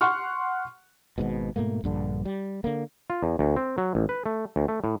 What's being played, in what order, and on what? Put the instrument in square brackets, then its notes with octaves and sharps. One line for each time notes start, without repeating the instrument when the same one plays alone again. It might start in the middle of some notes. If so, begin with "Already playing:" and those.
[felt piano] F#5 C6 C#6 F6
[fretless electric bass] G#1 G#2 B2
G#2 B2 A3 A#3
A#1 G2 D3
G3
D3 A#3
[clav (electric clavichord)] F4
E2
D2
C4
F#3
A1
B4
A3
D2
A3
A2